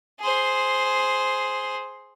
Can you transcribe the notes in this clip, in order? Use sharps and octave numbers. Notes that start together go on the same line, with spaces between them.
G#4 C5